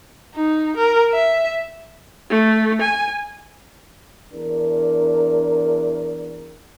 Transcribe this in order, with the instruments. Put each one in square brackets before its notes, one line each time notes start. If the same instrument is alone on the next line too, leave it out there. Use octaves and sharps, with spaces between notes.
[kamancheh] D#4
A#4
E5
[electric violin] A3
G#5
[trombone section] E2 D4 A#4